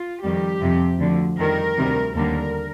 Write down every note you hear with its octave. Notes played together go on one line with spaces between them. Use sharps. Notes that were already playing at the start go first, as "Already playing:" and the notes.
Already playing: F4
F2 D#3 G3 G4
F2 C3 F3
D2 D3 F3
F2 D#3 G3 A#4
D2 C3 D#3 G3
D#2 D3 G3 A#4